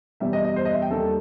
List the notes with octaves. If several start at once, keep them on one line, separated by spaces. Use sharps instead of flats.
E2 B2 G3 E5
D#5
D#5
C5
D#5
E5
G5
D#2 D#3 G3 A4